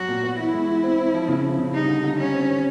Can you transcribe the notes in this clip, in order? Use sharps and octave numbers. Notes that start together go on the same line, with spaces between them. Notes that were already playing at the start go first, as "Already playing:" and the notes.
Already playing: F#3 F#4
A#2
B3
E3 E4
G#3
E3
C4
C4
F3
C#3
F3
C#3
G3 D#4
D3
D3
G3 C#4
C4
D#3